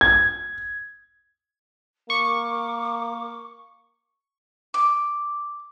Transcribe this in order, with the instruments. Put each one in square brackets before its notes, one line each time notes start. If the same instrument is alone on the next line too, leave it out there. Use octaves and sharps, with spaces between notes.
[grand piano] G#6
[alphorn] A#3 [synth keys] C#6 [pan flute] D6
[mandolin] D6